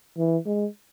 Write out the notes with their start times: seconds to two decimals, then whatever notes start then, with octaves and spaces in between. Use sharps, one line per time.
0.17 E3
0.46 G#3